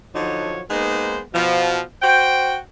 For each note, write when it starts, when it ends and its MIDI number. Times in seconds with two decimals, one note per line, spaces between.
0.15 0.62 50
0.15 0.62 53
0.15 0.62 54
0.15 0.62 63
0.15 0.62 73
0.70 1.20 56
0.70 1.20 58
0.70 1.20 59
0.70 1.20 63
0.70 1.20 72
1.34 1.81 47
1.34 1.81 53
2.02 2.57 66
2.02 2.57 72
2.02 2.57 79